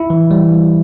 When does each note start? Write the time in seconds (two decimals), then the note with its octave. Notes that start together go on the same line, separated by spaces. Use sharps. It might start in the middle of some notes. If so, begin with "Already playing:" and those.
Already playing: E4
0.10 E3
0.31 G3